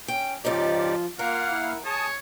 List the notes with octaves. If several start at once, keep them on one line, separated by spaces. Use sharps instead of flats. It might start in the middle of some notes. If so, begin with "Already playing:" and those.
C#4 G5
G#2 C#3 F3 D#4 F4 G4 D5 D6
A#3 F4 A#4 F5 F#5 F6
E4
G#4 C#5 A5 D#6